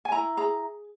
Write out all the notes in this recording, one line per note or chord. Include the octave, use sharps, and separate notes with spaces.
G#5
E4 A#5
G#4 A#5